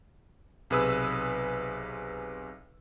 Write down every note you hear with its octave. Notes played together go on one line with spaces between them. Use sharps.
B1 C3 G#4 B4 D#6 E6